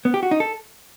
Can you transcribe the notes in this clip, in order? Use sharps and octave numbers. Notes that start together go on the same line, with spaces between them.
B3
G4
F#4
D#4
A4